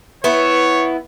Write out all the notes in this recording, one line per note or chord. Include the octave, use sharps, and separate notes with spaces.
B3 E4 C#5